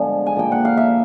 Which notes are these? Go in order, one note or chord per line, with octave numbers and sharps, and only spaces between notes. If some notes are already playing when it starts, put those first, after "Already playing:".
Already playing: G2 D3 F3 G#3 B3
G#5
A#2 F3 A#3 G5
F#5
F5
E5